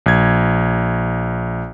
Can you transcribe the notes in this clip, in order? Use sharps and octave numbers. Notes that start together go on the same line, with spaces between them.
A#1 G#6